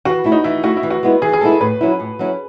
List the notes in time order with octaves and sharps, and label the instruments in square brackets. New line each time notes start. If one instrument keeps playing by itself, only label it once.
[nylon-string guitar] E3 [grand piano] F#4
[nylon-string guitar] A3 E4
[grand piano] D#4
[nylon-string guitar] E3 [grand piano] E4
[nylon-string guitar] A3 E4 [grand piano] F#4
[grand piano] E4
[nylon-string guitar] E3
[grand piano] F#4
[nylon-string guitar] G#3 B3 E4
[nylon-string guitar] E3 [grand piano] G#4
[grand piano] G#4
[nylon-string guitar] G#3 B3 E4 [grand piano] A4
[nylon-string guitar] A2 [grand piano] B4
[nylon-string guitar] F#3 C#4 E4
A2
F#3 C#4 E4